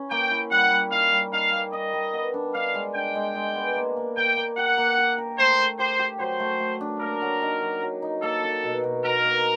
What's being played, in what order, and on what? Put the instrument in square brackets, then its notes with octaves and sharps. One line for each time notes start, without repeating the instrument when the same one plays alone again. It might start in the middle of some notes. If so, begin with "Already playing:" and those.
Already playing: [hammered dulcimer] C#4 E4
[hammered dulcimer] A#3 [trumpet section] G5
[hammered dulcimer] E4
[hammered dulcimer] G3 [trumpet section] F#5
[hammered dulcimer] G3
[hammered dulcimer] D#4 [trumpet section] F5
[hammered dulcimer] G3
[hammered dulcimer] D#4 [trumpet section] F5
[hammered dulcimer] A#3
[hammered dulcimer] D#4 [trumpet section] D#5
[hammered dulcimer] G3
B3
D4
[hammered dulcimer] D4 [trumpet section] F5
[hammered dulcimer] G#3
[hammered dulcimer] D4 [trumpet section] G5
[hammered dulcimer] G#3
G#3
B3
A#3
A#3
[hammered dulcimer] A#3 [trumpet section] G5
[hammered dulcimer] A#3
[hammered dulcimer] G4 [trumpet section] F#5
[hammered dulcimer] A#3
G4
A#4
[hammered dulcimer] A3 [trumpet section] C5
[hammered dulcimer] A3
[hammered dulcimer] G4 [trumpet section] C5
[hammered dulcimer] G4
[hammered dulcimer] F#3 [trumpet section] C5
[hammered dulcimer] A3
A3
D4
[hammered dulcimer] A#3 [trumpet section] A#4
[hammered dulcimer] F#3
D#4
F#3
F#3
D#4
[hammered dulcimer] A#3 [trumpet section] A4
[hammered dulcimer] D#4
B2
B2
[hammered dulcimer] B2 [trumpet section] A#4
[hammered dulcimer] A#3